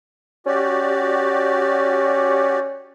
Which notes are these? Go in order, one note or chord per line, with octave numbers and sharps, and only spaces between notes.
C#4 F#4 G4 D5